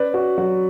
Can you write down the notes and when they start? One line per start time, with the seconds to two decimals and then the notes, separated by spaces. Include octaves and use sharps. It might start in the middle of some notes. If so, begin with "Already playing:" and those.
Already playing: C#4 B4 D5
0.14 F#4
0.38 F#3 F#4